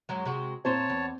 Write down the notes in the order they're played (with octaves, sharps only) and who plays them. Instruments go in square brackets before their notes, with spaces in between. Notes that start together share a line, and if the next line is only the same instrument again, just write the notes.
[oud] F#2 F#3 G#3
C3 G#3 F#4
[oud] A#2 C5 [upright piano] C4 [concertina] C#5 A5
[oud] E2